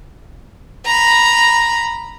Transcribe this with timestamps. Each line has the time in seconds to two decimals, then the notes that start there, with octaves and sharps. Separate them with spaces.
0.86 A#5 B5